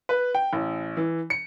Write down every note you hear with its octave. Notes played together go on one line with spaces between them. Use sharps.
B4
G5
A1
E3
C#7